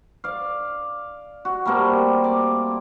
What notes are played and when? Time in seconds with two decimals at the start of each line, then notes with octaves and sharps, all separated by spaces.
0.24 D5 F5
1.45 F#4
1.65 G3 A3 A#3 C4
2.24 D5